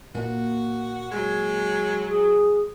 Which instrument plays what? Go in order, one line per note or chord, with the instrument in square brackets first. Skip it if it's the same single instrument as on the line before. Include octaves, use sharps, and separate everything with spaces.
[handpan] A#2 A#3 [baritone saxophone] F#4
[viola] F#3 [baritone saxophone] G#3
[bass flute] G#4